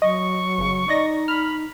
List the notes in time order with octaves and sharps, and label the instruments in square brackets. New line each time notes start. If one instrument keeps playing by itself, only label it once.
[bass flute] F#3 [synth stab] D#5 [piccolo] C#6
[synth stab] G1 C#3
[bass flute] D#4 [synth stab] D5 D#5 A#6
[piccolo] B5 [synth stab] F6